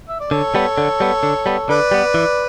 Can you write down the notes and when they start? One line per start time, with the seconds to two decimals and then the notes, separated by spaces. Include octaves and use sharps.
0.09 E5
0.20 D5
0.31 D3 A4 C#5
0.55 G3 B3
0.78 D3
1.00 G3 B3
1.23 D3
1.46 G3 B3
1.69 D3 B4 D5
1.91 G3 B3
2.14 E3